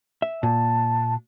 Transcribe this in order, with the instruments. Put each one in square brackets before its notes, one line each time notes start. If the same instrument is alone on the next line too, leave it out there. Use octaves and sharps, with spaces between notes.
[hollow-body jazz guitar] E5
[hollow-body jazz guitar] A#2 [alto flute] A5